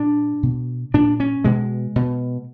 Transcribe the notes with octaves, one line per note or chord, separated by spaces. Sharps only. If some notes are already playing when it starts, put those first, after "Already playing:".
Already playing: A#2 D4
B2
A#2 D4
C#4
B2 G#3
B2